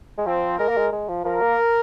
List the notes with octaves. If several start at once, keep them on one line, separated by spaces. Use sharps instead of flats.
G#3
F3 C4
G#3 A#4
A#3
G#3
G#3
F3
F3 A#4
A#3